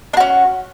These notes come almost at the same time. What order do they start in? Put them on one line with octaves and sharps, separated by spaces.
D4 F#4 C#4